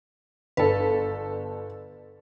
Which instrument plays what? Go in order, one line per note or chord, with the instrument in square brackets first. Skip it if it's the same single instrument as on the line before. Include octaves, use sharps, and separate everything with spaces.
[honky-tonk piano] G1 A4 [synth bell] B4